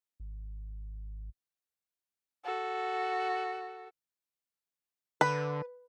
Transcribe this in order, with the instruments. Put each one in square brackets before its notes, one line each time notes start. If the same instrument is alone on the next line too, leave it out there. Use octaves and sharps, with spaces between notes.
[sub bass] G#1
[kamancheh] F#4 A4
[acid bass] D3 [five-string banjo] B4